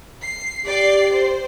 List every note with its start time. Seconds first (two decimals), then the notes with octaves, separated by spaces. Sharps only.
0.22 C7
0.66 G4 D5 G5 C7
1.12 C5